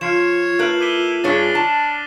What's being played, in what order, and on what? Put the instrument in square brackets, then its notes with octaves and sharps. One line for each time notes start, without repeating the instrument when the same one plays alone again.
[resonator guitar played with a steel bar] F3 [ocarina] F4 [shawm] C#5 [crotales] F6 C7 E7
[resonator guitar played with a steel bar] A3 A#4 B4 [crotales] F6 F#6 F#7
[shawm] E4 [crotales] D6 D#7 G7
[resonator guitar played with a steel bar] G2 G#4 C#5 [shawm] D4 [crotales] A6 B6
[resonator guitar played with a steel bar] A5